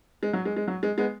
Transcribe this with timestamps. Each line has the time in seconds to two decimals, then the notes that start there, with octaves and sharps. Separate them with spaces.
0.23 G#3
0.33 F#3
0.45 G#3
0.56 G#3
0.68 F#3
0.83 G#3
0.98 G#3 B3